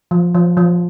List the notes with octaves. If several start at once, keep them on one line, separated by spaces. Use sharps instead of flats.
F3
F3
F3